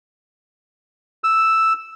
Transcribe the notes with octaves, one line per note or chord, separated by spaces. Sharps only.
E6